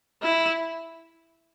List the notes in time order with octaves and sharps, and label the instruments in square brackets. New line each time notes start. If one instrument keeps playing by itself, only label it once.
[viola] E4